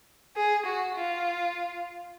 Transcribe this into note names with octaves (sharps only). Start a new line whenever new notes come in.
G#4
F#4
F4